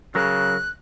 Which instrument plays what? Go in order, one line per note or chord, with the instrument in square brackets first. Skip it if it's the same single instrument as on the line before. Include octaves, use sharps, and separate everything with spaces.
[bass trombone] C#3 [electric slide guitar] F#3 A#4 [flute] F#6